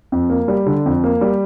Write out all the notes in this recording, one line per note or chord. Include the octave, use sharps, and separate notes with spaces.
F2
A#3
G3
D3
F2
A#3
G3